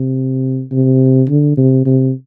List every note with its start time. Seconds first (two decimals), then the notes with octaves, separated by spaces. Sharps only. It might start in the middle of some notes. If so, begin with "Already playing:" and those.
Already playing: C3
0.72 C3
1.29 D3
1.57 C3
1.86 C3